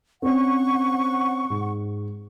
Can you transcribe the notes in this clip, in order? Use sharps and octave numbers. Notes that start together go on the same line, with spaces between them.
C4 C#4 F#5 C#6
G#2